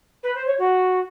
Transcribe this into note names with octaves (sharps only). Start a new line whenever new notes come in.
B4
C5
C#5
F#4